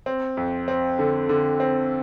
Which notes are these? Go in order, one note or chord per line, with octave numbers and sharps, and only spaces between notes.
C4
F2
C4
D3
D3
C4